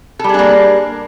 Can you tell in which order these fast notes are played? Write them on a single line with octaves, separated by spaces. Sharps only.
A4 G3 G#4 D4 A#3